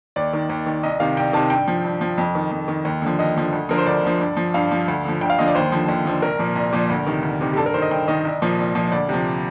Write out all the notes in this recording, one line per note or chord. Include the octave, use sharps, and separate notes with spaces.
D#2 D5
D#3
D#2
D#3
C2 D#5
C3 D#3 F5
C2 G5
C3 D#3 A5
G2 G5
F3
G2
F3
F2
D#3
F2
D#3
D#2
D3 F3
D#2 D#5
D3 F3
D2
D3 F3 A#4
C5
D2 D5
D3 F3
G2
F3
G2 F5
F3
D2
D3 F3
D2 G5
F5
D3 F3 D#5
D5
D#2 C5
D3 F3
D#2
D3 F3
C2 A#4
A#2 F3
C2
A#2 F3
D2
C3 D#3
D2
C3 D#3
G4
G2 A4
A#4
D#3 C5
D#5
G2 G5
D#3 D#5
C2
A#2 F3
C2
A#2 F3
D2 D5
C3 F3